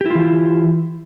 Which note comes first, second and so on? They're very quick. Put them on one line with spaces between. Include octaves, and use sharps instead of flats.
G4 E4 F4 E3